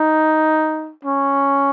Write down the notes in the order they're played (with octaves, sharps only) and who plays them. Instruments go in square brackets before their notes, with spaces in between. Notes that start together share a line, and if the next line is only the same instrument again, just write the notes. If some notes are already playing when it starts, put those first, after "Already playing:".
Already playing: [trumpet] D#4
C#4